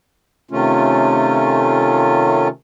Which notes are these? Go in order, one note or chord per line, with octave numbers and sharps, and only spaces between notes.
C3 D#3 A3 C#4 F4